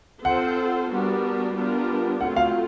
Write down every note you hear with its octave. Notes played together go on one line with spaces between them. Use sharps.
C4 F4 A4 C5 F#5
G3 B3 D4 F#4 A#4
G3 B3 D4 F4 A#4
F#3 A3 C4 F4 F#5
F5